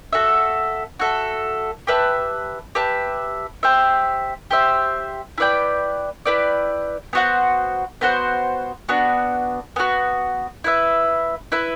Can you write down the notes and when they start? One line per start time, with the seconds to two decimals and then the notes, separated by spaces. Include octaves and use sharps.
0.13 F#4 A4 E5
1.00 F#4 A4 E5
1.87 G4 B4 E5 A5
2.75 G4 B4 E5 A5
3.63 G4 C5 E5
4.51 G4 C5 E5
5.38 E4 B4 D5 G5
6.25 E4 B4 D5 G5
7.13 B3 F#4 C5 F#5
8.01 B3 F#4 C5 F#5
8.89 B3 D4 F#4
9.76 B3 D4 F#4
10.64 E4 B4 E5
11.52 E4 B4 E5